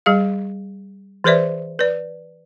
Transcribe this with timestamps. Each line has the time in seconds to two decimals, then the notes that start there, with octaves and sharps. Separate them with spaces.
0.06 G3 G#4 F5
1.24 E3 G#4 B4 C5 D5 E5
1.79 B4 D5